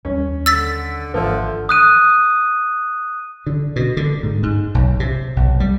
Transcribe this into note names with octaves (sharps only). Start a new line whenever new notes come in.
D#2 G3 C#4
D3 E6 A6 B6
G#1 D3 F3 E5
D#6 F#6 D#7
D3
B2
D3
G#2
G#2
B1
C3
B1
G3